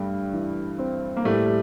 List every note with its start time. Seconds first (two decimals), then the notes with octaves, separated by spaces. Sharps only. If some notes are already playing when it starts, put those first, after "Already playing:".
Already playing: G2 G3 A3
0.33 E3
0.79 C4
1.17 A#3
1.25 A2 G3 A3
1.46 G3